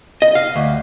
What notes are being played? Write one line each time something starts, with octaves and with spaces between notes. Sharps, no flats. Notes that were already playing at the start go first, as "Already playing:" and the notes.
D#5
F5
D2